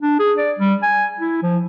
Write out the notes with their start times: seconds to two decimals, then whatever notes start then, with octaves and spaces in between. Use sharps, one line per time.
0.01 D4
0.19 G#4
0.38 D5
0.59 G3
0.83 G#5
1.20 E4
1.43 F3